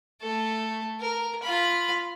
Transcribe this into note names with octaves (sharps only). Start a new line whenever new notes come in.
A3 A4
A#4
F4 B5